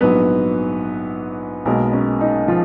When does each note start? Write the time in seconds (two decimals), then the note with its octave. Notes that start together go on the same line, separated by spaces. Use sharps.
0.01 A#1 G#2 F#3 B3 B4
1.65 B1 B2 G#3 A#3 B3 A#4
1.93 C#4
2.21 D#4
2.48 F3 F4